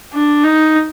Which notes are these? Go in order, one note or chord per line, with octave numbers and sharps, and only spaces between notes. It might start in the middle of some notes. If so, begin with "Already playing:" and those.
D4
D#4